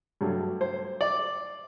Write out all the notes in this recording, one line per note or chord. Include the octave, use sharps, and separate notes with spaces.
G2 F#3 A3
C5
D5